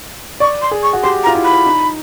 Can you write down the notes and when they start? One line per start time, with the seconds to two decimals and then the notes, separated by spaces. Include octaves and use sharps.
0.40 D5 C#6
0.62 C6
0.71 G#4
0.83 C#6
0.93 F#4
1.03 G4 C6
1.24 A#5
1.27 F4
1.35 E4
1.44 B5
1.66 D#4